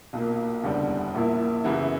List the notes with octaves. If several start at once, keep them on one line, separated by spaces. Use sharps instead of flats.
B1 A#2 A#3
F#1 E2 D3 G3
A#1 A#2 A#3 E4
F#2 C#3 E3 B3 E4